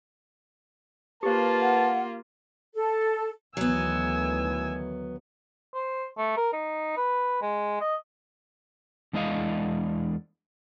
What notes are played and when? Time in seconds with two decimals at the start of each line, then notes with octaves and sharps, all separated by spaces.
1.23 A#3 F4 G4 B4 C5 A5
1.61 F#5
2.75 A4
3.57 D2 D#3 E3 F#3 B3 G#5 E6
5.74 C5
6.17 A3
6.37 A#4
6.52 D#4
6.96 B4
7.42 G#3
7.81 D#5
9.13 E2 G#3 D4 E4 D#5 F5